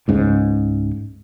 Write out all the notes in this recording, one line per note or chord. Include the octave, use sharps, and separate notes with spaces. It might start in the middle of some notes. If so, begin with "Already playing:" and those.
C#2 G#2 C#3